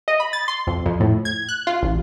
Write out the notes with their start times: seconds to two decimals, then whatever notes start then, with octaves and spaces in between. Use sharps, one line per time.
0.08 D#5
0.20 B5
0.33 A6
0.48 C6
0.67 F2
0.86 F2
1.00 A2
1.25 G#6
1.49 F#6
1.67 F4
1.83 A1